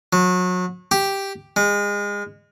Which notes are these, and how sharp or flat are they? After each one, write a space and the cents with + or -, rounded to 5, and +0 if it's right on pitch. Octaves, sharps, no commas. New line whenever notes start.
F#3 -30
G4 +0
G#3 -30